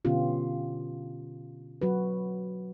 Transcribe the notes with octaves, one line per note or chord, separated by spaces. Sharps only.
B2 D3 B3 C#4 F4 G4
F#3 F#4 B4